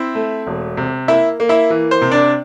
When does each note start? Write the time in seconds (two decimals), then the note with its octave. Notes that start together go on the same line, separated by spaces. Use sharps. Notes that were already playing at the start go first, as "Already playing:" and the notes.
Already playing: C4 E4 E5
0.15 A3
0.47 E1
0.77 C3
1.08 A#3 E4 E5
1.40 A#3
1.49 E4 E5
1.70 E3
1.91 C5
2.02 C3
2.11 D4 D5